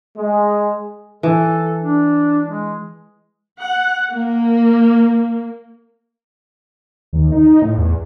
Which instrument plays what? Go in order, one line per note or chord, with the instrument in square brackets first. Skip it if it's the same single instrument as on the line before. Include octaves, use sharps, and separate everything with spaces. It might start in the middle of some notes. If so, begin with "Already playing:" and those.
[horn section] G#3
[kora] E3 [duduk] A4
[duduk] D4
G#3
[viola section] F#5
A#3
[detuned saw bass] D#2
D#4
A2
E2